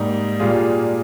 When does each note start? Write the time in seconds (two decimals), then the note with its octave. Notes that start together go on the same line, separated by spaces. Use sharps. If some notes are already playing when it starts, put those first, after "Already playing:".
Already playing: G#2 G3 A#3 D#4
0.40 A#2 G3 A#3 F4 G#4